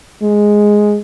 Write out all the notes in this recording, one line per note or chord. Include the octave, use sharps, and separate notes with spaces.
G#3